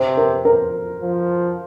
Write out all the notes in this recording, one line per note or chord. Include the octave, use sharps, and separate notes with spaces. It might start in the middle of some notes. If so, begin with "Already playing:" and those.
Already playing: C3 C5
A#4
A#4
F3